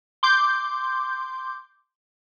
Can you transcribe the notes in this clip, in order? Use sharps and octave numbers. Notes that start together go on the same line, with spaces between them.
C6 D6 G6